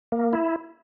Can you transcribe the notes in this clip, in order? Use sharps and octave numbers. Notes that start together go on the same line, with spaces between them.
A#3
E4